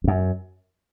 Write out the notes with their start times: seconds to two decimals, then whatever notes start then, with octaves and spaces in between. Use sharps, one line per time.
0.04 F2
0.08 F#2